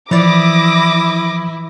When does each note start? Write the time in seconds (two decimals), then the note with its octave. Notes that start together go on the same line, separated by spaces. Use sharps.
0.11 E3 F3 E4 D5 D6 D#6 A#6